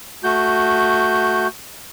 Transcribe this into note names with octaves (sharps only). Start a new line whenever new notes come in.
A3 F#4 G6